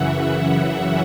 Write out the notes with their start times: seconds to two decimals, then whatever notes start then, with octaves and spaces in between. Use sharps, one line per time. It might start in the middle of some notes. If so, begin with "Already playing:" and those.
Already playing: F#2 C#3 E3 E5 F#5
0.31 E5
0.74 E5